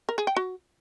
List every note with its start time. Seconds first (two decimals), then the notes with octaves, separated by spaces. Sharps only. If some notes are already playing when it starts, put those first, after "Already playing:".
0.09 A#4
0.18 G#4
0.27 G5
0.36 F#4